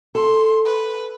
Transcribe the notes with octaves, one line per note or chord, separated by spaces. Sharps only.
A4 C6
B4